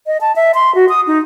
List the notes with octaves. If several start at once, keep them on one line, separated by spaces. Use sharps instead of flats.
D#5
A5
E5
C6
F#4
D#6
D#4